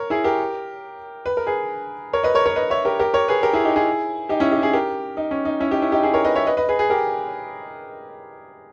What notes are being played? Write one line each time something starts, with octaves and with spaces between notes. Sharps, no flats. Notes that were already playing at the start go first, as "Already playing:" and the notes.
Already playing: A#4 C#5
E4 G#4
G4 A#4
B4
A#4
G#4 B4
A#4 C#5
B4 D#5
A#4 C#5
A#4 C#5
B4 D#5
C#5 E5
G4 A#4
G4 A#4
A#4 C#5
G#4 B4
G4 A#4
E4 G#4
D#4 G4
E4 G#4
D#4 G4
C#4 E4
D#4 G4
E4 G#4
G4 A#4
D#4
C#4
D#4
C#4 E4
D#4 G4
C#4 E4
D#4 G4
E4 G#4
A#4 C#5
B4 D#5
C#5 E5
B4 D#5
B4 D#5
G#4 B4
G#4 B4
G4 A#4